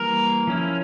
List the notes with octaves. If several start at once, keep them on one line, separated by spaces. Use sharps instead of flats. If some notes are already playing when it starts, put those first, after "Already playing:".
Already playing: E3 G3 A#3 A#4
F3 C#4 E4